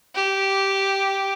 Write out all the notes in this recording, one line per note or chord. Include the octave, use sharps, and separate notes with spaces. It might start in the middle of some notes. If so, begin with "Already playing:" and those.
G4